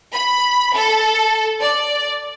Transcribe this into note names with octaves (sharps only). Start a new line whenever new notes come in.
B5
A4
D5